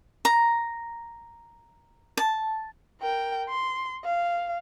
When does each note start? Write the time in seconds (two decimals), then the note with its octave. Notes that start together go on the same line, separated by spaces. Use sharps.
0.25 A#5
2.17 A5
3.01 A#4 G5
3.49 C6
4.04 F5